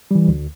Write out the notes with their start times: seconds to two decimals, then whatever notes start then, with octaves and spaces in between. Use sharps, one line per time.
0.11 E3 G3
0.28 D2